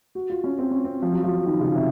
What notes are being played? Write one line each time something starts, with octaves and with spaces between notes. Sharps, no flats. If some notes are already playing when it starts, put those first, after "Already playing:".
F#4
F4
C#4
C4
C#4
C4
F3
F#3
F3
D#3
C#3
C3